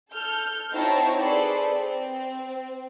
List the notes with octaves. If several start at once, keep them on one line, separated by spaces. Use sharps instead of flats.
A4 F6 G6
C4 D#4 E4 F#4 C#5 A5
G#4 A4 B4 C5 D5
C4